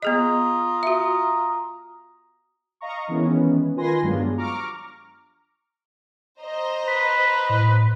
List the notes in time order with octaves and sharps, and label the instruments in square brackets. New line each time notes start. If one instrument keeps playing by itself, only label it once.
[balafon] B3 G#4 D#5 [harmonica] F4 A#5 D#6
[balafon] F#4 E5
[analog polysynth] D#5 F5 A#5 C#6
D#3 E3 G#3 B3 C#4
D#3 F4 B4 G#5 C6 A#6
G2 F#3 G#3 B3 D4 F4
A#5 C#6 D6 F6
[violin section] C5 D#5 A#5
[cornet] B4 [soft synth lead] B6
[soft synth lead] A2